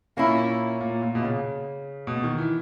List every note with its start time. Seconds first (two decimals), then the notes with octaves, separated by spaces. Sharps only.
0.17 A#2 A#3 C#4 E4
0.81 A#2
1.02 A#2
1.15 B2
1.22 C#3
2.07 B2
2.23 D#3
2.38 E3